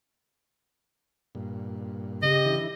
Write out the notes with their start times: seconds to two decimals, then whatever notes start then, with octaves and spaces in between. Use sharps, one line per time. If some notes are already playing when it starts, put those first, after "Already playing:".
1.35 G2 A#2
2.22 C#3 G4 D#5
2.45 D3 E3 E4